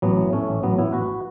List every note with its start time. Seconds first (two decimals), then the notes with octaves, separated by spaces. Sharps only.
0.02 A1 F#3 B3
0.17 E3
0.33 A2 A3 C#4
0.48 A1
0.63 A1 F#3 B3
0.78 A1 B3 E4
0.93 A1 F#4 B4